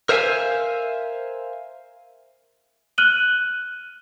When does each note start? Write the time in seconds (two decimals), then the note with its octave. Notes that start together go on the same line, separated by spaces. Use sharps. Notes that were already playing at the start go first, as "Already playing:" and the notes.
0.09 A#4 C5 E5 F5 G5 G#5
2.98 F6 F#6 D#7 F#7 G7